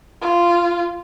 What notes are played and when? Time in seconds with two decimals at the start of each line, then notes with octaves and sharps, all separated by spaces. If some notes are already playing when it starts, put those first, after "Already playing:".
0.21 F4